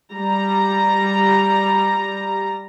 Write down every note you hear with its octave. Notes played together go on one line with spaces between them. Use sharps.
G3 A#5